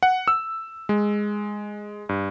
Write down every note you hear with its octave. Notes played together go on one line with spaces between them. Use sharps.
F#5
E6
G#3
G2